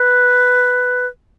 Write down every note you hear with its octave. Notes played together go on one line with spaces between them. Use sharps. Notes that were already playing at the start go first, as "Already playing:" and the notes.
Already playing: B4